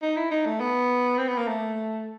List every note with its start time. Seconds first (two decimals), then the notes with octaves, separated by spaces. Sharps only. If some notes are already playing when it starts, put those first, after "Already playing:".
0.02 D#4
0.17 E4
0.31 D#4
0.45 A3
0.60 B3
1.18 C4
1.28 B3
1.37 A#3
1.48 A3